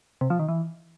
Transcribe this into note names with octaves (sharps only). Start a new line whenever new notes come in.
C3
F3
D#3
E3